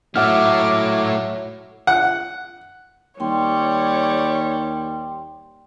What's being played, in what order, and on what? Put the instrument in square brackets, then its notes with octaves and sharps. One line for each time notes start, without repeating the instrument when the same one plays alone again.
[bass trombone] F#3 [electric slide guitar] A3 E4 [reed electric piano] E5 F#5 F6 [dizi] D6
[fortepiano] F#5
[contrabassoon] D#2 [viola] G3 [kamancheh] C#5 [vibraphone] G5 C6